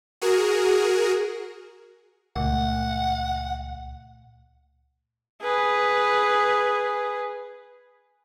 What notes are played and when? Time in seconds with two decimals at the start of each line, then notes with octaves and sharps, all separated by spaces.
0.22 F#4 G#4 A#4
2.36 C#2 A#2 A3 F#5
5.42 G#4 B4